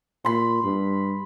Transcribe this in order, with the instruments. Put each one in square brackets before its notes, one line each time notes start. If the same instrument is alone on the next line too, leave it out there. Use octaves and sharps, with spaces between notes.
[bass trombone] A#2 [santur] B5 C6
[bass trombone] G2